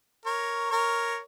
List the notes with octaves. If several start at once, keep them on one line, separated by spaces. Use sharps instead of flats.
A#4 C#5
A#4 C#5